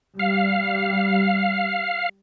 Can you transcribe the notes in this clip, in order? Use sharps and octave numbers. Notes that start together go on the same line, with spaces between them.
G3 F5